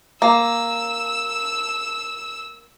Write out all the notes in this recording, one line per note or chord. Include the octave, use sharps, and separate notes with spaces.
A#3 E6